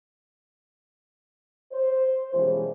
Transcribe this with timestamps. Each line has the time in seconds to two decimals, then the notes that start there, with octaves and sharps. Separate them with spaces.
1.72 C5
2.34 F#2 B2 E3 F3 G3 G#3